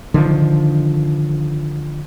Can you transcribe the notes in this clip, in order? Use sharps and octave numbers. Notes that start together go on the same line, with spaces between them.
D3 D#3 F3